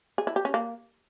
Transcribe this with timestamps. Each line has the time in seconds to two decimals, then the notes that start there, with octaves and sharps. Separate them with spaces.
0.18 G#4
0.27 E4
0.36 G4
0.45 C#4
0.54 A#3